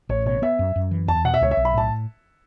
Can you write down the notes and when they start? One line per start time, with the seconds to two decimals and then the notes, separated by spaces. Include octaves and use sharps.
0.09 A1 C#5
0.26 B2 C#5
0.42 B3 E5
0.59 F#2
0.76 F#2
0.91 E3
1.08 E2 A5
1.25 B2 F#5
1.34 E5
1.41 C#2 C#5
1.51 E5
1.57 B1
1.65 B5
1.74 A2 A5